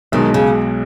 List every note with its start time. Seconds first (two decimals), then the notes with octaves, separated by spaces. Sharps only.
0.12 B1 B2 D#3 G#3
0.34 C#3